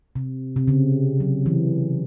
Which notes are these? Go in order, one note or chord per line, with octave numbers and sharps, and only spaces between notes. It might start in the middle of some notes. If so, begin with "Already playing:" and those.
C3
C3
C#3
F#3
E3